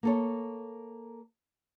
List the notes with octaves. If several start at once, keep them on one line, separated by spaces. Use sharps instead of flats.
A#3 A4 C#5